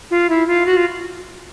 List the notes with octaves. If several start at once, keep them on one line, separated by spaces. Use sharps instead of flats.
F4
E4
F4
F#4
F4